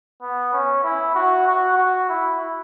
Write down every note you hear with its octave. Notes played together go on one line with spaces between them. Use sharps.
B3
C#4
E4
F#4
F#4
F#4
E4